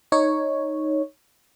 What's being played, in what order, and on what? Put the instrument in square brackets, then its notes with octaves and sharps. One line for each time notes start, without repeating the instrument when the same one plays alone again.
[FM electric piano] D#4 C#5